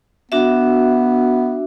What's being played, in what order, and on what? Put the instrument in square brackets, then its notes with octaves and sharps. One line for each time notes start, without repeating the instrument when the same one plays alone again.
[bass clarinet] B3 [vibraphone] D4 F#4 E5